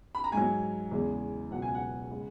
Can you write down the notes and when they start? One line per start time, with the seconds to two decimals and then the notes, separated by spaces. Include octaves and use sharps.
0.15 B5
0.24 A#5
0.32 G#2 F#3 G#5
0.91 E2 C#3 G#3
1.51 C#2 B2 F#3 F#5
1.62 G#5
1.75 F#5
2.11 C#3 G#3